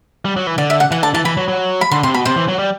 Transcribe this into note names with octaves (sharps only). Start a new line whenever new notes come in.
G3
F#3
E3
D3 D5
E5
F#5
E3 F#5
D3 A5
E3 A5
E3 B5
F#3
F#3
B5
D3 C6
C3 C6
B2 B5
C3 C5
E3
F#3
G3